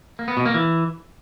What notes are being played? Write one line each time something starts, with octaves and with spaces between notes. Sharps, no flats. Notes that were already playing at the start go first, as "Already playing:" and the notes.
A#3
B3
B2
A#3
E3